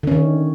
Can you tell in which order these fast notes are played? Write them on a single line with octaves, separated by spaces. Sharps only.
D3 C#4 D#3